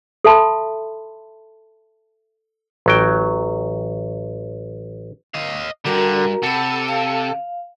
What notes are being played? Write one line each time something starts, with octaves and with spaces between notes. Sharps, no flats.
A4 E5 A5 B5 C6
A1 F#3 G5
D#5 F5
G2 D3 F#4 A#4 A#5
C3 A4 F#5 B5
F5